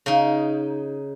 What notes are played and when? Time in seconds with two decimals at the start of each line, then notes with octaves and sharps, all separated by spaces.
0.06 C#3 D#4